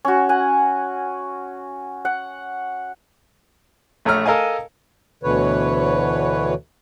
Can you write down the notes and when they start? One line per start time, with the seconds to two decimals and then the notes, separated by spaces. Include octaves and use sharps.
0.05 C#4 F#4
0.29 F#5 G#5
2.05 F#5
4.05 A#1 A3 C#5 A#5 E6 F6
4.26 A4 A#4 D#5 F5 G#5
5.23 D2 B2 D3 E3 B4 C#5